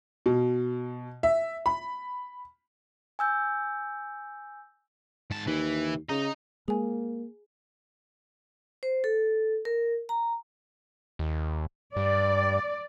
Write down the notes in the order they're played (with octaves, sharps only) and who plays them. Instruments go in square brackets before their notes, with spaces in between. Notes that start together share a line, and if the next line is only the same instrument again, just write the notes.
[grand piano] B2
E5
B5
[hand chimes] G#5 E6 G6
[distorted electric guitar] G#2 A5
[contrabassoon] D#2 [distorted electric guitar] E3
[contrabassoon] C#3 [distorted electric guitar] D#5 A#5
[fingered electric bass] G#3 [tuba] A#3 [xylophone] G#4 G#5
[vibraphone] C5
A4
A#4
A#5
[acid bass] D#2
[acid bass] G2 [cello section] D5